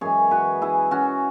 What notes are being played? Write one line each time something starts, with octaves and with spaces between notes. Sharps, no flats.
F#2 E3 G#3 G#4 C#5
F#4 B4
E4 G#4
C#4 F#4